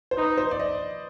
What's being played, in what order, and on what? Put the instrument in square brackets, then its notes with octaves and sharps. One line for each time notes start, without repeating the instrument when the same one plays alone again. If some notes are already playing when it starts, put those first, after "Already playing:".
[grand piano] C5
[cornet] D#4 [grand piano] B4
[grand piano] C5
D5
D#5